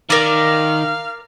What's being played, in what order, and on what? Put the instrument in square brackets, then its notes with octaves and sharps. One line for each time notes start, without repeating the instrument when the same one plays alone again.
[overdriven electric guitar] D#3 [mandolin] A#4 D5 [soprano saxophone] F5